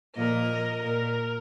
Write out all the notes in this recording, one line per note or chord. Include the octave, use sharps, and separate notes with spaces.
A#2 F3 A#3 A#4 D#5
A#2 A#3 A#4